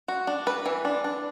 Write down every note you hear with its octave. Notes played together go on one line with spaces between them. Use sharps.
F#4
D4
B4
E3
D4
D4